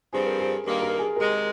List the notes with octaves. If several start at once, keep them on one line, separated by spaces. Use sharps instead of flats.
G2 F3 C4 G#4
A#4
G#4
G2 D#3 A#3
A#4
G#4
C3 D#3 G#3 A#4